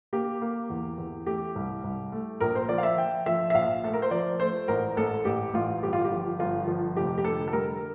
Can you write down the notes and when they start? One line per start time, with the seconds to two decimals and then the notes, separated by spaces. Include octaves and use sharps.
0.13 A#3 G4
0.41 A#3
0.70 E2
0.98 E2
1.26 A3 G4
1.56 C2
1.84 C2
2.12 A3
2.41 A#1 A#4
2.55 C5
2.69 F3 D5
2.78 F5
2.83 E5
2.98 F3 G5
3.26 F3 E5
3.50 E5
3.54 A#1 F5
3.83 A3 A4
3.94 A#4
4.02 C5
4.11 F3 D5
4.40 A3 C5
4.68 A1 A#4
4.97 A1 A4
5.25 A1 G4
5.53 A1 F4
5.82 G1 G4
5.93 F4
6.05 G4
6.12 F3
6.39 G1 F4
6.68 F3
6.96 F1 G4
7.18 G4
7.24 D3 A4
7.48 A4
7.53 G3 A#4